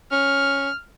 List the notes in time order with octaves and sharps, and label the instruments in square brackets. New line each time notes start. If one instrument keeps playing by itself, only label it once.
[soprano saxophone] C#4 [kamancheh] F6